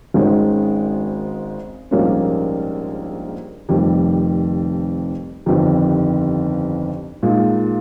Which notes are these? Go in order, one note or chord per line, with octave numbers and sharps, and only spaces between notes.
G#1 G#2 D#3 G#3 C#4
A#1 G#2 G3 A#3 C#4
F1 F2 D#3 G3
G1 F2 D#3 G3
A#2 G#3 D#4